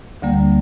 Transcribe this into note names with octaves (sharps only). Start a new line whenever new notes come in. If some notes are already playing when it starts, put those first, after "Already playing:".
D2 D3 G3 A#3